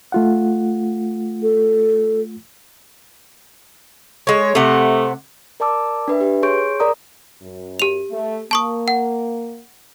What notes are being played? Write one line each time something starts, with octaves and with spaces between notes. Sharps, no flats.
A3 F4 F#5
A4
G#3 C#5
C3 A3 F#5
A#4 D5 A5 D6 E6
D4 B4 E5
G4 B4
G#4 C#5 C6 C#6 G6 D7
A#4 D5 A#5 D#6
F#2
G4 F7
A3
A#3 A5 C#6 D#6
F#5